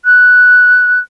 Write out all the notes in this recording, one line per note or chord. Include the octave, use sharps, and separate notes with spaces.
F#6